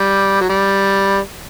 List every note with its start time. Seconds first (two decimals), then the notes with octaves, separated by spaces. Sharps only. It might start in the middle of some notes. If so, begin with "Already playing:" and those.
Already playing: G3
0.41 F#3
0.49 G3